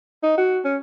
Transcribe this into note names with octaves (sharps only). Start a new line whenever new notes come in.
D#4
F#4
C#4